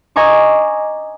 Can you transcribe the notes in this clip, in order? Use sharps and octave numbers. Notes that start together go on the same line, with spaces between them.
D#5 G#5 A#5 C#6 D6